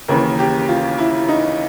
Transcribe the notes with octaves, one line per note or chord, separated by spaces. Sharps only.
D#2 C#3 E3 A#4
G4
F4
E4
D#4